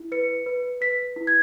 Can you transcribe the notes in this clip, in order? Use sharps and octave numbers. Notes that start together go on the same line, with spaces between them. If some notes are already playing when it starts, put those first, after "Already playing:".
Already playing: E4
B4 C#7
B4
B4 B6
E4
G#6